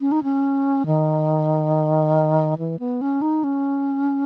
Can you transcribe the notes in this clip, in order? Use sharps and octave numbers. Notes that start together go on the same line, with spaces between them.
C#4
D#4
C#4
D#3
E3
B3
C#4
D#4
C#4